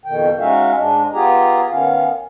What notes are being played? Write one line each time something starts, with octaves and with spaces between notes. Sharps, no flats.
F2 B2 D#3 G5
G#3 C#4 D#4 F#4 E5 F5
G#2 G#3 D4
B3 F4 G4 G#4 A#5
D#3 B3 C#4 F5